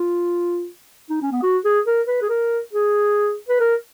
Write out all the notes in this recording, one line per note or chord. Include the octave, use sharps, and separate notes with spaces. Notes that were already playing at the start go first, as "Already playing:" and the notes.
Already playing: F4
D#4
C#4
B3
F#4
G#4
A#4
B4
G#4
A#4
G#4
B4
A#4